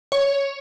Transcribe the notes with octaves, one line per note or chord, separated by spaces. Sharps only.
C#5